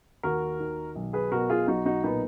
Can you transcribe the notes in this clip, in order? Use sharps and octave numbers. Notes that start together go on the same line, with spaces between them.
D#2 F#4 A#4
D#3
B1
G#4 B4
B2 F#4 A#4
F4 G#4
B1 D#4 F#4
D#4 F#4
A#2 B3 D#4